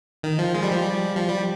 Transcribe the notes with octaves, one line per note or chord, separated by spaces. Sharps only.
D#3
F3
G#3
G3
F3
G3
F3
G3